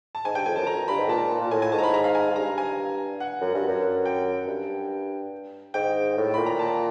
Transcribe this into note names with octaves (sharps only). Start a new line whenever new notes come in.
A5
G#2 G#5
G2 G5
F2 G#5
F#2 A5
F2 A#5
G2 B5
G#2
A#2 A5
A#2
A2 G#5
G#5
G#2 A5
A#5
B5
A#5
F5
G#5
G#2
G2 A#5
G#5
F#5
F#2
G2
F#2
G5
G2
G#2 G5
A2
A#2 B5
A#5
A5